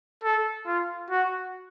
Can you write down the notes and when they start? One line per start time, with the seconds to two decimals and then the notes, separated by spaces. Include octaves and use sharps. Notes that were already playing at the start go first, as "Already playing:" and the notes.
0.23 A4
0.66 F4
1.10 F#4